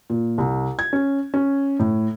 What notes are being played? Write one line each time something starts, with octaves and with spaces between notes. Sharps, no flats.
A#2
C2
G#6
C#4
C#4
A2